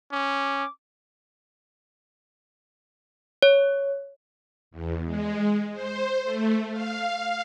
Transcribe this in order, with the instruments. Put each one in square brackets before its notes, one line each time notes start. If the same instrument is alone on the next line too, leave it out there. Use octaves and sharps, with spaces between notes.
[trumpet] C#4 [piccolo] D6
[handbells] C#5
[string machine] E2
G#3
C5
A3
F5